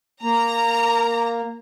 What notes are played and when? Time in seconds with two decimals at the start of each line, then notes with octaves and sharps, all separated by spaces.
0.23 A#3 A#5